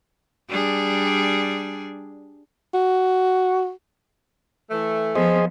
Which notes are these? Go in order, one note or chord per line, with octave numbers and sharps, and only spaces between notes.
G3 D4 G#4
F#4
E3 A3
F3 B3 G#4 C5 D#5